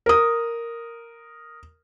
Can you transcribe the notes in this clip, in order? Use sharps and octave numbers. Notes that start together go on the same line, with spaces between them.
A#4 D#6